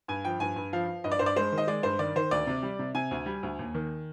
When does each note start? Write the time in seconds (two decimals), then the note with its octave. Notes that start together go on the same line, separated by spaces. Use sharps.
0.08 G2 G#5
0.25 F3 G5
0.40 G2 G#5
0.56 G2
0.73 F3 F5
0.88 F3
1.04 G2 D#5
1.12 D5
1.19 G2 C5
1.26 D5
1.36 G#3 C5
1.52 D#3
1.58 D#5
1.67 G#3 D5
1.83 G2 C5
1.99 D#3 D5
2.16 D#3 C5
2.31 D2 D5
2.47 C3
2.63 G3
2.79 C3
2.95 C3 G#5
3.11 D2
3.26 G3
3.43 D2
3.59 D#2
3.75 D#3